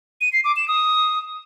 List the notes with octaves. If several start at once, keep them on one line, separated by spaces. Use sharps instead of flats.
D#7
C7
D6
E7
D#6